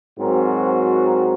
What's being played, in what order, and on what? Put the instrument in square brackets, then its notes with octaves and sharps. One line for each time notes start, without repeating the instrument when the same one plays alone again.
[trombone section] G#2 F#3 C4 F#4 A#4